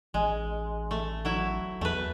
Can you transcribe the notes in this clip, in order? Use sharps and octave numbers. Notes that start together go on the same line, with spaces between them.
A1 G#3
A3
F#3 E4 E5
E2 A3 B4